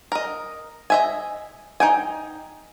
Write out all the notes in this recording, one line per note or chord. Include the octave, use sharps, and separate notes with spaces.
A#4 D#5
D#5 E5 G#5
D#4 G5 G#5